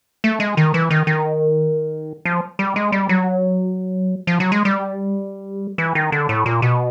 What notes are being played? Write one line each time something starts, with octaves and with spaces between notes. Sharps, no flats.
A3
G#3
D#3
E3
D#3
D#3
F3
G3
G#3
G3
F#3
F3
F#3
G#3
G3
E3
D#3
D3
A2
A#2
B2